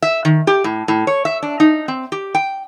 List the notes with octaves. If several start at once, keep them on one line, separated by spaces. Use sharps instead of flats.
E5
D#3
G4
A2
A2
C#5
E5
D4
D#4
C4
G4
G5